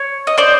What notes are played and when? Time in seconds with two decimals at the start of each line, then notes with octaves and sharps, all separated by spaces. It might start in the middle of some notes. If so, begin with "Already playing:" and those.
Already playing: C#5
0.27 D#5
0.38 C5 D5